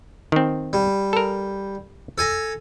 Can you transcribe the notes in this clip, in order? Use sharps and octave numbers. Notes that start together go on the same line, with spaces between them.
D#3 C4
G3
A4 A#4
A4 G#5 A#5